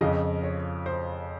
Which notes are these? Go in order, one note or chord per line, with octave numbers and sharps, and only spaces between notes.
F2 C#3 F3 D#5
C#5
C5